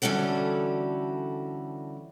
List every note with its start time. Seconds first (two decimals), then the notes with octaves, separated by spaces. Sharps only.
0.02 D3 E3 G3 C#4 F#4 A4